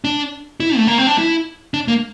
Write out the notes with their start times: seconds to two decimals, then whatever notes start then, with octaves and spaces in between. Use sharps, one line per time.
0.04 D4
0.60 E4
0.77 A3
0.87 A#3
0.98 C4
1.07 D4
1.18 E4
1.74 D4
1.88 A#3